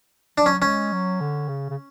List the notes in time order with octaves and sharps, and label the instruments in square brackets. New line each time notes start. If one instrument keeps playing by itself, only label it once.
[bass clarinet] F#3 [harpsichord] D4
[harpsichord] C#4
[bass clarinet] G#3 [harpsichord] C#4
[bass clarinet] F#3
D3
C#3
C#3